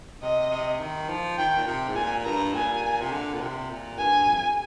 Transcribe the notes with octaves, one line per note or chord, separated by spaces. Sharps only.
C3 D#5
C3
D#3
F3
D#3 G5
A#2
C3
G#2
A#2 G#5
G2 A#5
A#2 G#5
C3
D3
A#2
C3
A#2
G2 G#5
F2